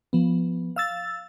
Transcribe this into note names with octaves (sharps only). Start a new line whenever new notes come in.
F3 B3
F5 E6 A6